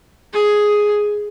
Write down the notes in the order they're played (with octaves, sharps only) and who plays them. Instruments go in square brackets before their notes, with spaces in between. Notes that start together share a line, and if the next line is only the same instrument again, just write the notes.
[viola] G#4